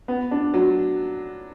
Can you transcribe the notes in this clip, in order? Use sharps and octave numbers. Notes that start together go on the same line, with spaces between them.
B3
D4
F#3